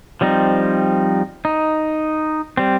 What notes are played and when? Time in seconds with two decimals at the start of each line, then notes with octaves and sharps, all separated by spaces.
0.21 F3 G3 C4 D#4
1.45 D#4
2.57 G3 C4